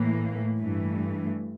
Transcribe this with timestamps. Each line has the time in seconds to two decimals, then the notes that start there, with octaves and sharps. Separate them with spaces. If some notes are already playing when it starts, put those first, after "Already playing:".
Already playing: A2 E3 A#3
0.58 G2 E3 A3